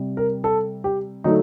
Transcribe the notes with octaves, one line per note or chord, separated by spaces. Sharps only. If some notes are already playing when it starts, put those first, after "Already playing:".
Already playing: C3 G3
A#4
A4
G4
D3 F#3 A3 D#4